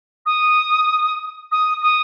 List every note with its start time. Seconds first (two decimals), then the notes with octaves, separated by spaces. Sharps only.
0.26 D#6
1.51 D#6
1.81 D#6